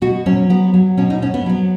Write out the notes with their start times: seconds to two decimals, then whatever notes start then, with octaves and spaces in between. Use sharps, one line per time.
0.02 B2 F#4
0.26 F#3 C#4
0.49 F#3 B3
0.74 F#3
0.97 B2 C#4
1.10 D#4
1.22 B2 C#4
1.34 B3
1.46 F#3 B3